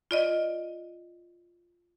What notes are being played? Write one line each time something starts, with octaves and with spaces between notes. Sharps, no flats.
F4 D5 D#5